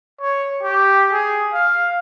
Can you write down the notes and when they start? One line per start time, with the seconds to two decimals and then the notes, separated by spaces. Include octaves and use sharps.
0.21 C#5
0.63 G4
1.12 G#4
1.53 F5